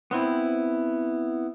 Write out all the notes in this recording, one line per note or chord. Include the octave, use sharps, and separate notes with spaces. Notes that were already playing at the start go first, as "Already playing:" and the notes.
B3 C4 E4